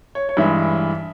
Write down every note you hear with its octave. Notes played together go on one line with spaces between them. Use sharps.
C#5
C#5
G2 E3 G#3 E5